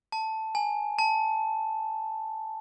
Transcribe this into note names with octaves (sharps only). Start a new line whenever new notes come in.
A5
G#5
A5